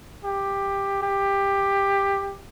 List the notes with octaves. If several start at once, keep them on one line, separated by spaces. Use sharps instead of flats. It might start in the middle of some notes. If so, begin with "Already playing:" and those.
G4
G4